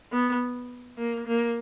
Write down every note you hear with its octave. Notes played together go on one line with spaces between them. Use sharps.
B3
A#3
A#3